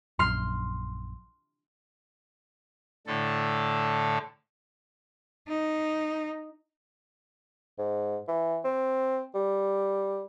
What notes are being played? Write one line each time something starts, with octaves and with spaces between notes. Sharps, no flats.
A#1 F#2 C6 F6 C7
A2 D3 A4
D#4
G#2
E3
C4
G3